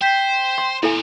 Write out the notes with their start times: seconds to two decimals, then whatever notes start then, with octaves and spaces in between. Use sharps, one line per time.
0.01 C5 G5 G6 B6
0.58 C6
0.83 E2 A#2 E4 A4 G#5